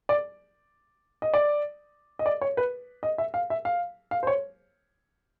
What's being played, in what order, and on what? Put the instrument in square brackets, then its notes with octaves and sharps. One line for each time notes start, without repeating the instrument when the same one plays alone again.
[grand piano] D5
D#5
D5
D#5
D5
C#5
B4
D#5
E5
F5
E5
F5
F5
C5
C#5